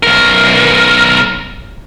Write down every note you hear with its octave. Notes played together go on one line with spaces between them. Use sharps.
B1 A#4